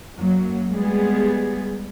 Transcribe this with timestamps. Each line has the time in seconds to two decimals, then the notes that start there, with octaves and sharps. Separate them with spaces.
0.17 F#2 F#3 A#3
0.69 G3 G#3 B3 G#4